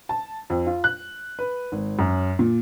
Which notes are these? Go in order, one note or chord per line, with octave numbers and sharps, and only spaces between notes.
A5
F2
F4
F#6
B4
G#1
F#2
A#2